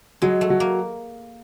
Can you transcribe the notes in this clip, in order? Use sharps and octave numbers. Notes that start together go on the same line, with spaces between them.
F#3 G#3
A3
F#3
A#3